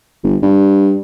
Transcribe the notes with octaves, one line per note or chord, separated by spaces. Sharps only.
G1
G2